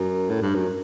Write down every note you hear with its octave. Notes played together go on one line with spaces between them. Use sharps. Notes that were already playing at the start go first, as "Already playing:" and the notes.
Already playing: F#2
A2
G2
F#2